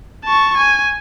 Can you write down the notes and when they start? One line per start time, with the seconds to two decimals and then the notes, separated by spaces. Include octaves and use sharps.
0.25 A5 C#6
0.57 G#5